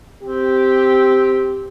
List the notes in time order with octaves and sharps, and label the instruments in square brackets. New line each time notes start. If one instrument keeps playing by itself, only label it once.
[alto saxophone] C4 [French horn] G4